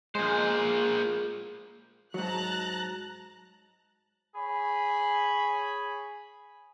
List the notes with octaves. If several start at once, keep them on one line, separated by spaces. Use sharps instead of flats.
A#2 G#3 C5
G#2 F#3 A5 A#5 F#6
G#4 C#5 B5